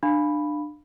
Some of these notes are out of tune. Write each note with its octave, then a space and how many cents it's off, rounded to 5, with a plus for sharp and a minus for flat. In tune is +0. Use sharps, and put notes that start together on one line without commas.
D4 +25 F5 +0 B5 +0